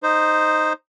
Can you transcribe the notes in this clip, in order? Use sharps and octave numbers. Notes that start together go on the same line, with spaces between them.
D#4 C5